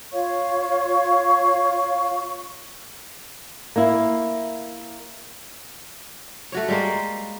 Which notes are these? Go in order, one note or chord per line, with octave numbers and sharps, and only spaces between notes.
F4 C#5 F5 C#6
A#3 E4
A3 F#4 C#5
G3 G#3 A#3